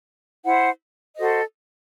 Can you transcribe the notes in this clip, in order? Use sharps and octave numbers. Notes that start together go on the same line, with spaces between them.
E4 C5 F#5
F#4 A4 C5 D#5